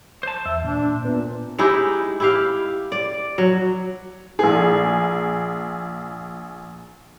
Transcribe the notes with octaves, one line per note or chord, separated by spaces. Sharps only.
C5 A5
E2 E5
A#2 D4
A#2 B3
G#3 D#4 E4 G4
E4 G4 F5
D5
F#3
A#1 G#4